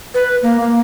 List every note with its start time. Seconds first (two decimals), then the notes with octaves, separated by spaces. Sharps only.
0.14 B4
0.42 A#3
0.60 A#3